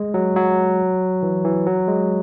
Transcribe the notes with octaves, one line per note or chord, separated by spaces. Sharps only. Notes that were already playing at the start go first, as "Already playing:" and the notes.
Already playing: G#3
F#3
F#3
E3
E3
F#3
G#3